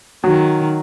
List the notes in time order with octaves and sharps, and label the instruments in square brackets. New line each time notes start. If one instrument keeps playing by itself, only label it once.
[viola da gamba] D#3 [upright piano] F#3